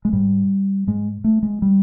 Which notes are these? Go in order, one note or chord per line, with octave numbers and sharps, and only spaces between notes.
G#3
G#2 G3
G#2 G#3
A3
G#3
G3